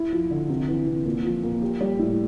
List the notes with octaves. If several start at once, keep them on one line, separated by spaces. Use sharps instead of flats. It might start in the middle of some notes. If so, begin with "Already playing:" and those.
Already playing: E4
F3
D3
C3
E3
C3
A#2
F3
A#2
G4
G3
A2